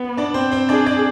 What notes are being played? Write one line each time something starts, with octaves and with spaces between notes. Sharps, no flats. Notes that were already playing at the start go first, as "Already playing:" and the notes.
Already playing: B3
D4 D5
C4 C5
C4 C5
D4 G#4 D5
D4 D5